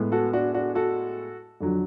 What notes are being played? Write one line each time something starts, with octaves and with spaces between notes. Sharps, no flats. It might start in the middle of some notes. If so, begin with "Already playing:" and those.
Already playing: A2 G#3 B3
F#4 A4
D4 F#4
D4 F#4
F#4 A4
F2 D3 F#3